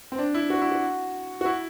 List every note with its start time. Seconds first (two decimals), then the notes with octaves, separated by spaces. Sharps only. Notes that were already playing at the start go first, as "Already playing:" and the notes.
0.12 C4
0.19 D4
0.34 E4
0.50 F#4
0.62 E4
0.72 F#4
1.41 F#4
1.45 E4